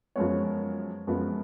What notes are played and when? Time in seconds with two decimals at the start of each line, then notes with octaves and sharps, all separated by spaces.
0.16 F#2 F3 G#3 B3 C#5
1.07 F#2 F3 G#3 B3